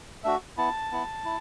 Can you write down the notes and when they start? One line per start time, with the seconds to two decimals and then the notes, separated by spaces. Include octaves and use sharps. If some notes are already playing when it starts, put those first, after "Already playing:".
0.24 A3 D4 F#4 E5
0.57 B3 E4 A5
0.91 B3 E4
1.25 E4